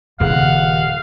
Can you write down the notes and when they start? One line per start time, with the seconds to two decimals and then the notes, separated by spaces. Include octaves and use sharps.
0.20 D#1 C#3 E4 F5 F#5